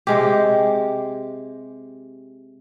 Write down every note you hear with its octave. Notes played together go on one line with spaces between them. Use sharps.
C3 G#3 G4